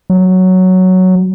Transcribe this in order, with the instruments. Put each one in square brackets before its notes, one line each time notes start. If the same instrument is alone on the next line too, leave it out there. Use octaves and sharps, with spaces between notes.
[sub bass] F#3